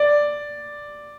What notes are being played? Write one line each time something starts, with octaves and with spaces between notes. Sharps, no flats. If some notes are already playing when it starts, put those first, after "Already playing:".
Already playing: D5